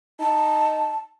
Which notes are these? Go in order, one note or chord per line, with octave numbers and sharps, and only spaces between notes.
D#4 A5